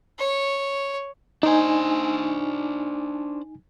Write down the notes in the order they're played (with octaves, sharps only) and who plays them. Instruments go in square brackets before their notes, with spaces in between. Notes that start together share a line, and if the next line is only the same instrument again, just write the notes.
[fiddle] C#5
[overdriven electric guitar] D4 C5 [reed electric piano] D#4 G#5